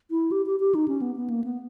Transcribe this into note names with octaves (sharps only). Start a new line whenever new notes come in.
E4
G4
G4
G4
D#4
C#4
B3
B3
A#3
B3